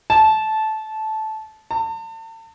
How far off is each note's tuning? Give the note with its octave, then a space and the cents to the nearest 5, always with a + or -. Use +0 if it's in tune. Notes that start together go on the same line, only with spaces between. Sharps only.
A5 -15
A5 +40